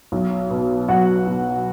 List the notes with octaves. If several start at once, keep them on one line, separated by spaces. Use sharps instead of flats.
B1
B2
B1 F#4 F#5
B2